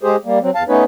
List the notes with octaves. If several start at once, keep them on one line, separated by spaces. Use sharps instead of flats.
G#3 G4 G#4 C5
G3 A#3
F#3 C4
E2 F5 A5
A3 B3 C#4 D#4 B4 C#5